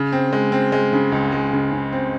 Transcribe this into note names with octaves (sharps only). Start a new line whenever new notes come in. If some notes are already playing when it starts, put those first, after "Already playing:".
Already playing: C#3
C4
G#3
C4
G#3
C#3
C#2
G#3
C#3
C#3
C4